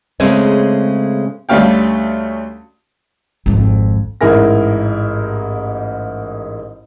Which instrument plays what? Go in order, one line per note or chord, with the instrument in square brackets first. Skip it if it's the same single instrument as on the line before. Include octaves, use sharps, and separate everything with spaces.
[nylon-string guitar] C#3 G#3 A3 C4 C#4
[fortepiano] D2 G3 A3 C#4 F5 G5
[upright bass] G#1 F2
[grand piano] A1 G#2 E4 A#4 G#5 A#6